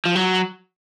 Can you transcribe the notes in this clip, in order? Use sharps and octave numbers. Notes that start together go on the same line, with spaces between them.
F3
F#3